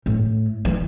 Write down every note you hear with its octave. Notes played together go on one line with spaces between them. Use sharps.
A2
E3